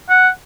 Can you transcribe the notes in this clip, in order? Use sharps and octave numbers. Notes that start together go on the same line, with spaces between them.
F#5